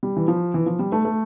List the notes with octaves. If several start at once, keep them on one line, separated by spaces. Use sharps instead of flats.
G3
E3
F3
E3
F3
G3
A3
A3